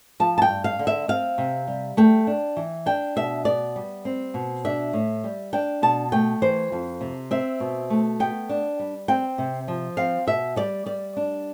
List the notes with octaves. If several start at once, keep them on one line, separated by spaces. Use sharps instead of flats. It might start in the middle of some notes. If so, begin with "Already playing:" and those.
F3 A5
A5
G5
G2
F5
D3
E5
C4 F5
C3
G3
A3 G5
D4
E3
D4 G5
B2 E5
B3 D5
G3
C4
B2
D4 E5
A2
G3
D4 G5
B2 A5
A3 G5
E3 C5
F2
C3
C4 E5
B2
A3
B3 G5
D4
G3
C4 G5
C3
F3
C4 F5
B2 E5
G3 D5
G3 D5
D4